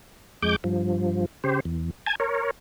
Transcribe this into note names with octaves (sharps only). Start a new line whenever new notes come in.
F2 G#3 D6 G6
G2 F3
C#3 G4 C5
E2
G#5 A5 G#6
A#4 C#5